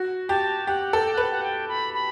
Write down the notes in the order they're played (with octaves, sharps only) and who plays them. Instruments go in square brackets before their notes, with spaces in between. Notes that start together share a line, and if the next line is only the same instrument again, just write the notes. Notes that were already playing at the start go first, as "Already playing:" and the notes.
Already playing: [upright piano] F#4
[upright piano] G4 [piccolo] A5
[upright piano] G4 [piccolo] F#5
[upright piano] A4
[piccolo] G5
F#5
[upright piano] B4
[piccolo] F#5
G5
B5
B5